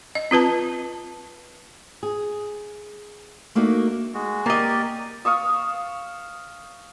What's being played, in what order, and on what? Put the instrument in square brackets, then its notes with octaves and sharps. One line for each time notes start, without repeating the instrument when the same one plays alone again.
[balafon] D#5
C4 F4 B4 A5
[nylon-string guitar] G#4
A3 A#3 D4 D#4 F#4
[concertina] G#3 F#4
[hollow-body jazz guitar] A#3 D#5 [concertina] G4 A#4 D5
[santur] F5 C#6 D#6 E6